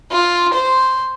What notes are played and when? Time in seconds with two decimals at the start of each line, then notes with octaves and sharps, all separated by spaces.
0.12 F4
0.54 C5